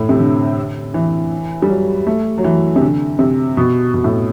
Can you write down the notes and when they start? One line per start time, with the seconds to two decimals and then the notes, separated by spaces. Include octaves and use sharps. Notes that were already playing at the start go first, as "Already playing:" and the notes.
Already playing: A2
0.09 C3
0.19 D3
0.94 E3
1.62 G3
1.69 F#3
2.07 A3
2.38 F#3
2.44 E3
2.76 C3
2.81 D3
3.19 C3
3.57 B2
3.94 B2
4.04 A2